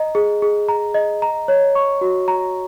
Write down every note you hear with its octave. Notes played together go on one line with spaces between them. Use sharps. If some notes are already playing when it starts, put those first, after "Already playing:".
Already playing: D#5 A#5
G#4
G#4
A#5
D#5
A#5
C#5
C#6
F#4
A#5